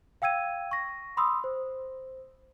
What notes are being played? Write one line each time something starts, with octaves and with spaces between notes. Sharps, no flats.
F5 G5 E6 G#6 D#7
C#6 A#6
B5 C6 D#6 E6
C5